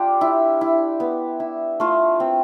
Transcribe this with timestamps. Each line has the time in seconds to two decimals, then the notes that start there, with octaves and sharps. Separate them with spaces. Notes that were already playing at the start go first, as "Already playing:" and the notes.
Already playing: D4 F4 G4
0.21 E4
0.61 E4
1.00 B3
1.40 E4
1.80 A3 F4
2.20 C4